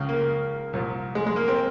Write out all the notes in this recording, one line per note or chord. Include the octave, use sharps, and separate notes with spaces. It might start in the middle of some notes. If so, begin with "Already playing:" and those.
Already playing: C#2 C#3
A#3
C2 A#2
G#3
G#3
A#3
C4